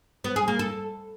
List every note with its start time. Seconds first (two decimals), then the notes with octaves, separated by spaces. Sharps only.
0.24 B3
0.36 G#4
0.48 A#3
0.59 A4